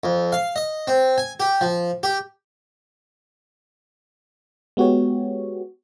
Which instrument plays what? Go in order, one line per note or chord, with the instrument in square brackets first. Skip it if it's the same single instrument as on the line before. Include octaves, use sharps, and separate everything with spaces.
[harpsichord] F2
F5
D#5
C4
G#5
G4
F3
G4
[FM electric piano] G#3 B3 F#4 G4 C#5